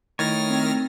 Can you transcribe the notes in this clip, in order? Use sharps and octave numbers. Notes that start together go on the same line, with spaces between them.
D#3 A3 E4 C#5 F6 A6 A#6
C4